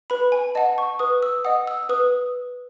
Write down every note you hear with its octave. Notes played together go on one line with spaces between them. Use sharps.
B4 B5
G#5
D#5 F#5 A5
C#6
B4 D#6
E6
D#5 F#5 D#6
E6
E6
B4 D#6